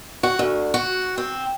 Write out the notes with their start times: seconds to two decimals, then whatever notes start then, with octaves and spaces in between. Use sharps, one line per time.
0.23 F#4
0.39 D2
0.74 F#4
1.18 C4